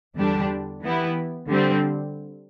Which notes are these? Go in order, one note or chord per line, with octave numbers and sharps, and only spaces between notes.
E2 D3 G3 D4 G4
E3 B3 E4 G4
D3 G3 C4